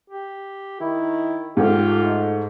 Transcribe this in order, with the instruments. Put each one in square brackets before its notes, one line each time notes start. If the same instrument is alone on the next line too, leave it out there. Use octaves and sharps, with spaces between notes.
[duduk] G4
[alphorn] D#3 [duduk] E4
[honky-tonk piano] G#2 A3 [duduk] F4 [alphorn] G4
[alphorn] D#4